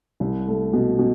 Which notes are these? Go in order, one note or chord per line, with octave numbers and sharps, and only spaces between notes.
C2
A3
B2
B2